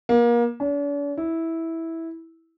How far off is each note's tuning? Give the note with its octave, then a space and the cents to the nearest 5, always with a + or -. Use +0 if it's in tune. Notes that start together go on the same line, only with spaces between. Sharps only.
A#3 +30
D4 -45
E4 -10